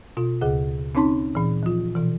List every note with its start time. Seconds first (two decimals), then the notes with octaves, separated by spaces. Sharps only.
0.17 B2 F4
0.41 D2 C#3 G#4 F#5
0.95 C4 C#4 D#4 C#5 A5 C6
1.35 A#2 E3
1.63 F3 F4
1.95 B2 E3